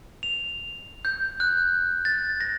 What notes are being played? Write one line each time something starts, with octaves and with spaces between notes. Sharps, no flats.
F7
G6
F#6
A6
A#6